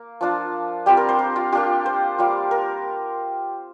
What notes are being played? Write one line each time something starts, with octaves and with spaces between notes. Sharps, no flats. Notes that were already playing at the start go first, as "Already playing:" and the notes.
Already playing: A#3
F3 D4 F4
G3 C4 F4 G4
A#4
C5
A#4
F4
A#3 D4 F4 G4
C5
G3 A#3 F4
A#4